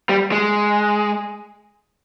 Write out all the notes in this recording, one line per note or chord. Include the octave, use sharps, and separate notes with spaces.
G3
G#3